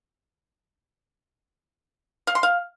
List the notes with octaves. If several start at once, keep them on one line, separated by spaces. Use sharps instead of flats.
F5
C6
F5